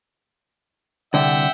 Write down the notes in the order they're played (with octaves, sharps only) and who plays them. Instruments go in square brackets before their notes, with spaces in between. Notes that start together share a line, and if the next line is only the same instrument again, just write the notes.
[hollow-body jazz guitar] C2 D3 [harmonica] E5 F#5 G5